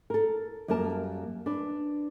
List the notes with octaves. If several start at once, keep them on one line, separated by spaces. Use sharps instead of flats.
A4 A#4
F#2 G3 A#3 A#4 A5
D4 B4